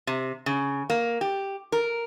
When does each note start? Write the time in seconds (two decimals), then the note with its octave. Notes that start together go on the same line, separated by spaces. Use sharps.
0.07 C3
0.46 C#3
0.90 A#3
1.21 G4
1.72 A#4